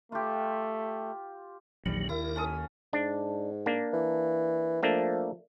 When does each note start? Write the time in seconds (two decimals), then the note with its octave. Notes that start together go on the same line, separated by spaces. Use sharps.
0.12 A3 F4 G4
1.86 A#1 E2 D#3 F#3 G3
2.09 D#2 E4 A#4
2.36 C#4 A4 D#6
2.93 G#2 D4
3.66 A#3 D4
3.93 E3
4.83 F3 A3 A#3 D4